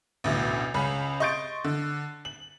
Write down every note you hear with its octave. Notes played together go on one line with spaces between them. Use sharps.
A1 D2 B2
C#2 C#4 B5
D#5 C6 C#6 G6 A6 D7
D3
F#7